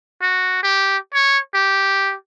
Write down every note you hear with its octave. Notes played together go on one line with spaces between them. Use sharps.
F#4
G4
C#5
G4